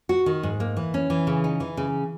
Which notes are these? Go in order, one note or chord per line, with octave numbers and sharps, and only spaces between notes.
F#4
D#3
G#2
A#3
E3
C#4
E3
C#3
D#4
E3
C#3